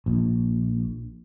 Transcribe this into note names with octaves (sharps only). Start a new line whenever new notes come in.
A#1